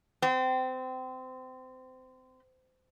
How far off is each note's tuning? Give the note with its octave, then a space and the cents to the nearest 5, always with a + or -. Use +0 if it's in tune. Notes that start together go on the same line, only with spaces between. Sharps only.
C4 -25